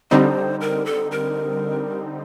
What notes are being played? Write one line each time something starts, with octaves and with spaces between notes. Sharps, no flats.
D3 G3 C4 D#4 C5
A#4
A4
A#4